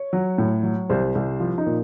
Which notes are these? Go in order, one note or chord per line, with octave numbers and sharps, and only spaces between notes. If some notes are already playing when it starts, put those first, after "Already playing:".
Already playing: C#5
F#3
A2
F#3
C2 C5
C2
F3 F4
D#4
A#2